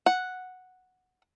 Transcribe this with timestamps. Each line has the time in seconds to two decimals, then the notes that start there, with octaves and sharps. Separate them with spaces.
0.06 F#5